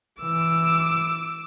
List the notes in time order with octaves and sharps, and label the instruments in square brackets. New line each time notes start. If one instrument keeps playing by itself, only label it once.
[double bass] E3 [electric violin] D6 E6